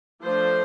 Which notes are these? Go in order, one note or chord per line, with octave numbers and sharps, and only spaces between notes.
F3 A3 D4 C5